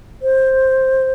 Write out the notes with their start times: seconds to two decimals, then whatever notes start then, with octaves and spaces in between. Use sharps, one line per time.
0.22 C5